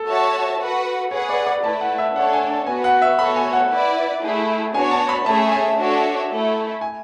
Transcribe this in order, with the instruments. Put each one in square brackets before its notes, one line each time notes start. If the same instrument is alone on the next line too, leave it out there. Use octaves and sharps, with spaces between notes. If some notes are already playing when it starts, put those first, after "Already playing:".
Already playing: [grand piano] A4
[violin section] F#4 C#5 E5 A5
F#4 B4 F#5
[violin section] G#4 B4 F#5 [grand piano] C#5
[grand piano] D5
D5
[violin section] A3 E4 B4 [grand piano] A5
[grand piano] F#5
E5
[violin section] D4 A4 C#5 [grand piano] F#5
[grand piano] G#5
A5
[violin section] B3 F#4 B4 [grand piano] G#5
[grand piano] F#5
E5
[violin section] B3 F#4 A4 C#5 [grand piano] B5
[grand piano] G#5
F#5
[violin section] E4 B4 D5
A3 E4 G#4
[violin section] B3 D4 F#4 C#5 [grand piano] G#5
[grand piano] A5
B5
[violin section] A3 C#4 G#4 C#5 E5 [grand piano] A5
[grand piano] G#5
[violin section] D4 F#4 A4 C#5 E5
A3 E4 A4
[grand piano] G#5